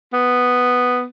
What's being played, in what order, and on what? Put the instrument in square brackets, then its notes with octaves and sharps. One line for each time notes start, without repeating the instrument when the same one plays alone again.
[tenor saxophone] B3